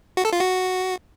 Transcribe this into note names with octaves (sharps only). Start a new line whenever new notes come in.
F#4
A4
F4
F#4